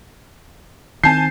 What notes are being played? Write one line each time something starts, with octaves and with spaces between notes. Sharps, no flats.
D#3 C4 G#5 A5 G6 C7